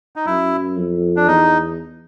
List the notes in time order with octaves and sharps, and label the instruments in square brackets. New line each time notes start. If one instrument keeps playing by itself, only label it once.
[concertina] D#4
[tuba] F#2 [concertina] E4
[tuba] F2
[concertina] D4
[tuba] E2 [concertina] D#4